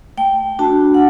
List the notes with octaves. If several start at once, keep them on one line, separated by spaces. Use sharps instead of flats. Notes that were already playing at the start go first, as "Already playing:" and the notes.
A3 G5
D4 F#4 A5
F#5